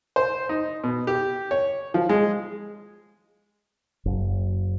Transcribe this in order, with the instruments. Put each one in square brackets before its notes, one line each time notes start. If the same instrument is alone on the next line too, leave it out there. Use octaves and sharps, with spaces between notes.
[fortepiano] C5
D#4
B2
G4
C#5
F3
G#3
[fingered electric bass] F#1